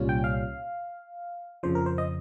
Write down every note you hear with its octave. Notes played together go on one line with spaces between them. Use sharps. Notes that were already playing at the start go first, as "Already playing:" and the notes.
Already playing: C2 A#2 G3 C#4 F4
G5
F5
F2 C#3 F3 C5
A#4
C5
D#5